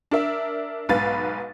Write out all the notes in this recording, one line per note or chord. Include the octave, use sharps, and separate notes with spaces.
D4 A#4 E5
B1 G#2 B4 F5 A6